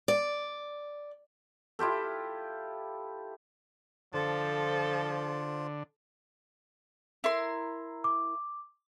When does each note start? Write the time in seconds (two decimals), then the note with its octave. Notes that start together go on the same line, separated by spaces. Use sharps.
0.08 D5
1.79 E4 F4 G4 A4
4.14 D3 F3 F4 A4 C5
7.24 E4 A#4 C6
8.04 D6